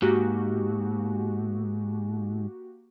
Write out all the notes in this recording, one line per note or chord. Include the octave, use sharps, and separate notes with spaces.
G#2 A#3 F#4 G4